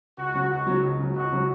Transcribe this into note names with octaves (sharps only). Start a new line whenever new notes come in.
C#2 F#4
C#3 F#3
C#2 F#4
C#3 F#3
C#2
C#3 F#3
C#2 F#4
C#3 F#3